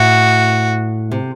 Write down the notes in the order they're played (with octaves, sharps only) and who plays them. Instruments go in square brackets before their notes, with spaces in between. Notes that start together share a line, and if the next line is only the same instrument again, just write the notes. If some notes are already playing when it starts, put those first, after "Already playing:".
Already playing: [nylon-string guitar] A2 [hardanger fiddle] F#4
[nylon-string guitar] C3